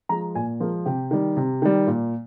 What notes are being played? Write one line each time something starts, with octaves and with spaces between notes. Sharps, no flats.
F3 G#3 A#5
A#2 G#5
F3 G#3 A#4
C3 G4
D#3 G3
C3
D#3 G3
A#2